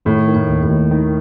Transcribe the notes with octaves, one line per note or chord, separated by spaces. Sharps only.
A2 D#3
D#3
A2
D#2
A2
D#2
D#3